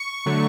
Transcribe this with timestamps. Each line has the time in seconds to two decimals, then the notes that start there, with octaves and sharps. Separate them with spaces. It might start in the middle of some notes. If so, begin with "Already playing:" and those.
Already playing: C#6
0.26 D3 F#3 A3